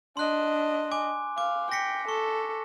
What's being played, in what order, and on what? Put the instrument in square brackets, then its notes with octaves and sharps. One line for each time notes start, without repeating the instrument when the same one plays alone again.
[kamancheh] D4 D#5 [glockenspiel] C6 F#6
[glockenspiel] G#5 D6
[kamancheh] F5 [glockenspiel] D6
[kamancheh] G5 [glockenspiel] A#6 B6 C#7
[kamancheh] A4 [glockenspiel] C#6